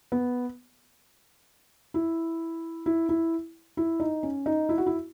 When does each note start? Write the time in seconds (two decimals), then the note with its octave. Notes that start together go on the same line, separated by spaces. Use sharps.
0.12 B3
1.94 E4
2.86 E4
3.09 E4
3.77 E4
4.00 D#4
4.23 C#4
4.46 D#4
4.69 E4
4.78 F#4
4.86 E4